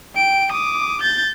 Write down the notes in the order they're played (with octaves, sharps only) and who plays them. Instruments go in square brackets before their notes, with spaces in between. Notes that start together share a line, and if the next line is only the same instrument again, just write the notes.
[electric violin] G5 D7
D6 D#6
G6 A6